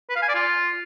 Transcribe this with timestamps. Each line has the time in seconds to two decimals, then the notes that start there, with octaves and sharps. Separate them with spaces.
0.10 B4
0.16 F5
0.22 G#5
0.29 D5
0.35 F4